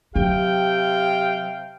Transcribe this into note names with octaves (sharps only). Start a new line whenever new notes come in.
C3 F#3 G4 F5 G5